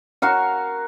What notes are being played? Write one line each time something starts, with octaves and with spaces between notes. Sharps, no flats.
F#4 A#4 F5 C#6